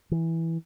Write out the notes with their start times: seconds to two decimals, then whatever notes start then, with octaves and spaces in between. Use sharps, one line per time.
0.11 E3